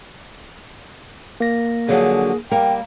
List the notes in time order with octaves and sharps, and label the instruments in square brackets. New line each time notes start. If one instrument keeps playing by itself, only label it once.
[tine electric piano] A#3 A#6
[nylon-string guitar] D3 F3 F#3 [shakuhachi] G#4
[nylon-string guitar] G3 A#3 A#4 [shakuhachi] G5